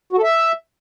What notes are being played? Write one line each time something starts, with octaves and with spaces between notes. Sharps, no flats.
F#4
A4
E5